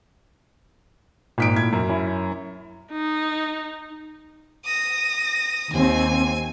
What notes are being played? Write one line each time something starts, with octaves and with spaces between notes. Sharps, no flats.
G#1 A#2 D#5 B6 D7
A2 G#6
F#2
C#4 E4
D#4
D#6 A#6
D#2 C4 G#5